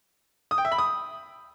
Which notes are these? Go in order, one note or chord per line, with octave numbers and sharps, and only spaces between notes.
D#6
G5
E5
B5
D#6